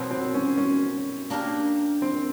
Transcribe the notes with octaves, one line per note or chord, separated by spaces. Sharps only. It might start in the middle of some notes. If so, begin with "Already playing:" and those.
Already playing: B2 F#3 B3 C4
C4
C#4
C#4
A#3 D4 G4 A#4
C4